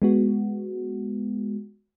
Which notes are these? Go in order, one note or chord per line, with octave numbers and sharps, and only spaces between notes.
G#3 B3 F#4